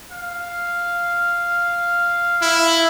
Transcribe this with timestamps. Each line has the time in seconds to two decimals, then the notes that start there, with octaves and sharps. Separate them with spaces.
0.12 F5
2.42 E4